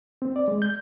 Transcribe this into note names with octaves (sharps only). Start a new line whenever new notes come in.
C4
D5
G#3
G6